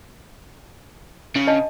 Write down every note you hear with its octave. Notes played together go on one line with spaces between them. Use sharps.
C#3
D4 D#5 A5